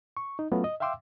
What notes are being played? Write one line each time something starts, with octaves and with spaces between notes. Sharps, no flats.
C#6
D#4
F#3 A3 B3 C#4 F4 F#4
D#5
E5 F5 G5 C6 D6 E6